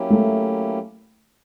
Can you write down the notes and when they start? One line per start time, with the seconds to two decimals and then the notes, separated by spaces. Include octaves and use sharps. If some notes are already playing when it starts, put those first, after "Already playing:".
Already playing: F#3 A#3 C#4 E4 G4
0.10 A3